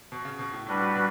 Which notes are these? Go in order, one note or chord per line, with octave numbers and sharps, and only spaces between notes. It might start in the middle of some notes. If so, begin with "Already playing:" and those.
B2
C#3
B2
A2
A2 G3 D4 F#4 B4
B2